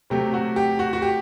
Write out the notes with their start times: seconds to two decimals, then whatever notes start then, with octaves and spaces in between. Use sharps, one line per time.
0.10 C3 F#3 A3 G4
0.34 F#4
0.56 G4
0.79 F#4
0.93 F#4
1.02 G4